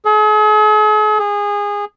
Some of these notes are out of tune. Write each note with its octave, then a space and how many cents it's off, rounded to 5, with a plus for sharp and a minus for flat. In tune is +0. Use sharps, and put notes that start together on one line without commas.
G#4 +45
G#4 -20